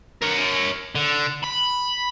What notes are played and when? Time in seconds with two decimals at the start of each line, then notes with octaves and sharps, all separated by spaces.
0.22 A#4 C#5
0.95 D3
1.44 B5